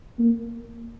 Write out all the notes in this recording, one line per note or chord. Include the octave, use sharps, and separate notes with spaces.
A#3